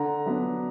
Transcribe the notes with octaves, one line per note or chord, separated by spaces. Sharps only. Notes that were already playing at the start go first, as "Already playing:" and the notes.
Already playing: D3 A#5
F#3 B3 D4